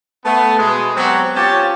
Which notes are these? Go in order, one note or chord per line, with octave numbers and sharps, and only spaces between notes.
A3 B3
B2 G#3
F#3 B3 C4 F#4 G4
C#4 F4 G4 C#5 A5